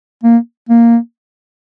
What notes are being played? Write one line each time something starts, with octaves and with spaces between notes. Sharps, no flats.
A#3
A#3